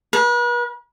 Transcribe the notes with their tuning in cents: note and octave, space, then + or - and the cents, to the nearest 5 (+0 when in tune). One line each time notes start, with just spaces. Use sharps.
B4 -40